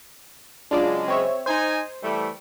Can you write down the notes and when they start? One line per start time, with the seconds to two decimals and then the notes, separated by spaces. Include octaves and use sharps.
0.71 C#3 F#3 G#3 D4 F4 D5
1.08 C4 C#5 E5
1.46 D#4 C5 G#5
2.02 E3 G3 A3